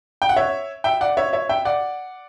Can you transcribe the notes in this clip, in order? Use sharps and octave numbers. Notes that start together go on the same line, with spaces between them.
G5
F#5
C#5 E5
E5 G5
D5 F#5
C#5 E5
C#5 E5
E5 G5
D5 F#5